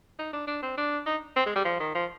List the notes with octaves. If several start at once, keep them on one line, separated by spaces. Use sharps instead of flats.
D#4
D4
D4
C4
D4
D#4
C4
G#3
G3
F3
D#3
F3